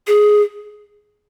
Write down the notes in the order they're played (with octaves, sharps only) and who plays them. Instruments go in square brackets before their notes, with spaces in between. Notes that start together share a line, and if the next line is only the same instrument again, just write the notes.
[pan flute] G#4